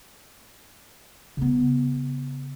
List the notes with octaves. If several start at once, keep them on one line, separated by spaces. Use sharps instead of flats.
C#3 B3